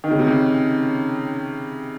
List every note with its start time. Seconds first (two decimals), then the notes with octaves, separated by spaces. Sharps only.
0.04 D#3
0.11 C#3
0.19 C3
0.27 C#3